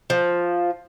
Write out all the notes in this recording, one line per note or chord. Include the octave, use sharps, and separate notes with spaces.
F3